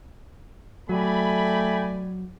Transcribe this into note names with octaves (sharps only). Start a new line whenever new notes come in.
F#3 A3 D5 G5 G#5 B5